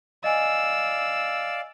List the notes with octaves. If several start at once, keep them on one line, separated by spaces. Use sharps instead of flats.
D5 D#5 F5 G#5 E6